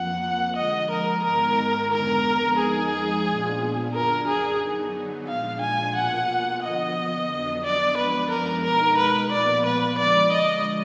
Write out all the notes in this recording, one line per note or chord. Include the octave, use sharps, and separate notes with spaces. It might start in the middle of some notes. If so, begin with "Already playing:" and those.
Already playing: F2 F3 A#3 F#5
D3 F3 G#3 D#5
A#4
G#2 D#3 G#3 B3 A#4
F2 D3 G#3 B3 A#4
F2 F3 G#3 D#4 G#4
A#2 F3 B3 D4 F4
F#2 D3 F#3 D4 A#4
G#4
D3 F#3 B3 D#4
A#2 F3 G#3 D4 F5
G#5
B2 A#3 F4 F#5
D3 F3 B3 D#5
F2 D3 F#3 B3 D4
D5
F#2 F3 G#3 B3 D4 B4
A#4
B2 G#3 D#4 A#4
B4
A#2 F3 B3 F4 D5
B4
D3 F3 G#3 D5
D#5